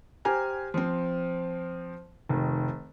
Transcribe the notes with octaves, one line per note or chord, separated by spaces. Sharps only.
G4 C5 G#5 A#5 F6
F3 C4
F1 D#3